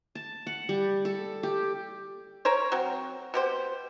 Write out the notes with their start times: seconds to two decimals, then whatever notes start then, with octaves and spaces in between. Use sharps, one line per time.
0.15 A5
0.47 F#5
0.69 G3
1.05 A4
1.43 G4
2.45 A#4 C5 C#5
2.72 F#3 C4
3.34 B2 G4 C5